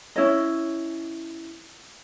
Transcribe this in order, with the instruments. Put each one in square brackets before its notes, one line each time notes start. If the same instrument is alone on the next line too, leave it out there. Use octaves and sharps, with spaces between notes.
[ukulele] C#4 E4 C#5 D#5